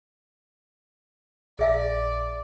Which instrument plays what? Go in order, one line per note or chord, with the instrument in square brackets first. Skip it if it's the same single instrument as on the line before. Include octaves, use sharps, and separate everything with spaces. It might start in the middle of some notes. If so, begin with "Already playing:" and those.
[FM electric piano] A#1 [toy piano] G#4 E5 F5 [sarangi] D5